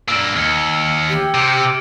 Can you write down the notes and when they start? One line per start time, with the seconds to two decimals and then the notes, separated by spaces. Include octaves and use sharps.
0.08 G2 A#3 E6
0.36 D#2 F6 G#6 C#7
1.09 G4
1.34 C3 D7 F7